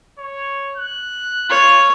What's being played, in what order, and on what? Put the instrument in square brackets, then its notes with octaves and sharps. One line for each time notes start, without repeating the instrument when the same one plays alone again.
[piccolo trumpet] C#5
F#6
[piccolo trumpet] F4 [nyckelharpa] C#5